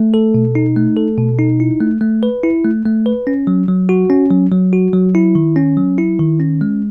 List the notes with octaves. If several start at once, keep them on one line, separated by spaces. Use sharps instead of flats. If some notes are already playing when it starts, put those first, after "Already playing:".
Already playing: A3
A4
B2
D#4
A3
A4
B2
D#4
E4
A3
A3
B4
E4
A3
A3
B4
C#4
F#3
F#3
F#4
C#4
F#3
F#3
F#4
F#3
E4
D#3
C#4
F#3
E4
D#3
C#4
G#3